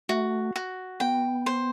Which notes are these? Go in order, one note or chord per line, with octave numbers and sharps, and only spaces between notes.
A3 F#4
F#4
B3 G5
C5